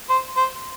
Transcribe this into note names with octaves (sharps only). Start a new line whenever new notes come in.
C5
C5